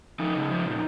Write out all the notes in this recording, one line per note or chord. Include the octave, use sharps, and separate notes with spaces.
F3 D#4
C#3
F3
A#2